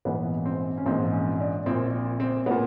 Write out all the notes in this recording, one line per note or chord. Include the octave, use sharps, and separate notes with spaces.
A#1 G#2 E3 B3
C4
C#4
A#1 G#2 E3 C4
C#4
D4
A#1 A#2 C4
C4
A#2 B3